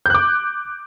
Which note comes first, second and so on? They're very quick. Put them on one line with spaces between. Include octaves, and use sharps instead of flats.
G6 F#6 D6